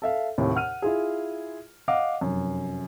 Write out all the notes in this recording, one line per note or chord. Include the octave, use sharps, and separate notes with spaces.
A4 E5 F5
D#2 A2 C3
F#5 F6 D#7
E4 F4 G#4
D#5 F5 F#5 D6
F1 F#2